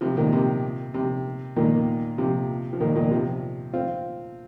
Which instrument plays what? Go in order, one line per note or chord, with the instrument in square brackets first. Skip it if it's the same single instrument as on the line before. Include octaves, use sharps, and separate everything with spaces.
[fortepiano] C3 F3
A#2 D#3
C3
C3
A#2 D#3
C3 F3
F3
A#2 D#3
A#2 D#3
C3 F3
C4 F4